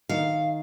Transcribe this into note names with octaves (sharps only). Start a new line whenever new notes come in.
D#3 F5